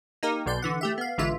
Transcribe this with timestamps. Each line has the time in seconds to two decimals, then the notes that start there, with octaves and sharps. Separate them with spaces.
0.23 A#3 D#4 G4 A#4
0.46 B1 B2 D5 C6 G6
0.62 D3 E3 F#5
0.81 A3 G4 E5
0.98 B3 F5
1.18 A1 D3 E3 G#3 F4 E5